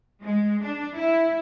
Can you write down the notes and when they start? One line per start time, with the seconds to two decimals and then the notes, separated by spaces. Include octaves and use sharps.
0.22 G#3
0.62 D4
0.95 E4